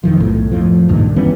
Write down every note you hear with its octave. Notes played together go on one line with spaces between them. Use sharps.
F2 D#3 F3
B1 A2
F2 A2 F3
D2 G2 A#2 D#3
E3 G3 B3 C#4